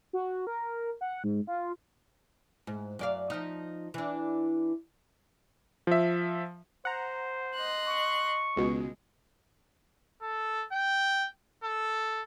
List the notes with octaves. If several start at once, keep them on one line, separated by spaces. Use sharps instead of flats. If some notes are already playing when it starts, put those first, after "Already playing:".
F#4
A#4
F#5
G#2
F4
G#2
F#2 D5 F5
F3 D#4
E3 D4
F3 E5
C5 F#5 A#5
D#5 C6 F#6
C#6
C#2 B2 G#3
A4
G5
A4